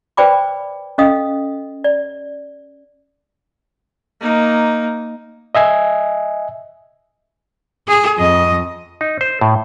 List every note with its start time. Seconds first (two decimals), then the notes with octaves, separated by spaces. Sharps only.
0.17 B4 C5 D5 G5 B5 D6
0.98 C#4 A4 D#5 F5 D#6
1.84 D5
4.21 A#3 D#4
5.55 D#5 E5 G#5
7.88 G#4
8.18 F2 D#5
9.01 D#4
9.21 C5
9.41 A2